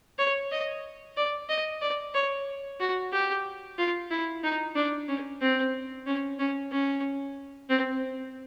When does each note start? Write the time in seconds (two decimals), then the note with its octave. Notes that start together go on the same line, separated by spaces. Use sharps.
0.18 C#5
0.51 D#5
1.17 D5
1.49 D#5
1.82 D5
2.14 C#5
2.80 F#4
3.12 G4
3.78 F4
4.11 E4
4.43 D#4
4.76 D4
5.08 C#4
5.41 C4
6.06 C#4
6.39 C#4
6.72 C#4
7.70 C4